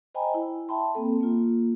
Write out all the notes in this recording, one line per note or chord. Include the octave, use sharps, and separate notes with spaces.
C5 D#5 G5 G#5 A#5 B5
E4
E5 G5 A5 B5 C6
A#3 C4 A4
A#3 F4